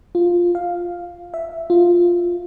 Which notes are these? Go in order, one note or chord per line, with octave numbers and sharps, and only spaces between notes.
F4
F5
E5
F4